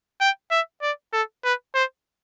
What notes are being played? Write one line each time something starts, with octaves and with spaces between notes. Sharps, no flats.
G5
E5
D5
A4
B4
C5